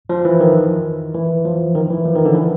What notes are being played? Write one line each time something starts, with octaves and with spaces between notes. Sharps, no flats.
F3
E3
D#3
E3
F3
D#3
E3
F3
D#3
D3
E3